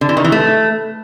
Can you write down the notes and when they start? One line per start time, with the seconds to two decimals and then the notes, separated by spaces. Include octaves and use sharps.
0.01 D3
0.09 E3
0.17 D#3
0.24 E3
0.32 A3